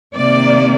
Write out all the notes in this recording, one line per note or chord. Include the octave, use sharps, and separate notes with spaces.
C3 D#3 A#3 D5